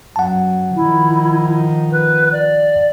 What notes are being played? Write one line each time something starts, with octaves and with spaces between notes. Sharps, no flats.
F#2 F#3 F#5 A5
D#3 F3 E4
B4
D5